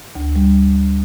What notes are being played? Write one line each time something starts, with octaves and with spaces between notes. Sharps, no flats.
D2
G3